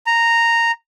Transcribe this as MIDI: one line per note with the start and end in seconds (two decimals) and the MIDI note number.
0.07 0.71 82